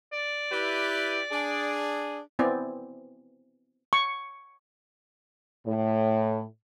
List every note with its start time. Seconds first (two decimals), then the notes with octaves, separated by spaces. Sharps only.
0.13 D5
0.51 E4 G4 B4
1.31 D4 G#4
2.39 B3 C4 E4 D5 G#5
3.93 C#6
5.66 A2